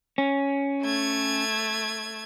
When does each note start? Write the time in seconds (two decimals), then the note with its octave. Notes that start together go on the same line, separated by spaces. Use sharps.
0.18 C#4
0.82 A3 G#6